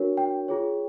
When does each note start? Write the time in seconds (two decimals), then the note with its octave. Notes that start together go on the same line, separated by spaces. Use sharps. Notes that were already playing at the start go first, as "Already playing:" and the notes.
Already playing: D4 F#4 A#4 C#5
0.17 G5
0.48 F4 G#4 C#5